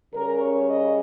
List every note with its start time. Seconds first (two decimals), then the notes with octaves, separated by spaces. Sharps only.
0.13 C#3 G3 C#4 A#4
0.41 C#5
0.69 D#5